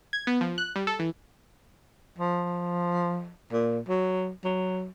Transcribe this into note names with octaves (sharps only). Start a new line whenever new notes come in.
G#6
B3
F3
F#6
G3
A4
E3
F3
A#2
F#3
F#3